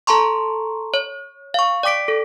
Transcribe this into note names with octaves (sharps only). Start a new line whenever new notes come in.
A4 A5 A#5 C6 C#6
C#5
F5 C#6
D5 G5 D6 B6 D7
A4